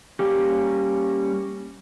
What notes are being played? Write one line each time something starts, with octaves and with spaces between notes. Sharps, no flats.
G3 A#3 C#4 G4